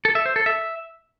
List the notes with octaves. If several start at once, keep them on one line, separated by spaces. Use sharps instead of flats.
A4
E5
C5
A4
E5